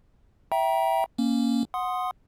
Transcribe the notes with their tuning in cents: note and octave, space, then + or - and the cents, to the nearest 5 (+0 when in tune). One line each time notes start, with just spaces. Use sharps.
E5 +0 G5 -15 A#5 +30
A#3 +5 C#4 +0
F#5 -10 C6 +0 D#6 +0